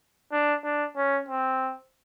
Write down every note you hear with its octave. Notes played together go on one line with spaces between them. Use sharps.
D4
D4
C#4
C4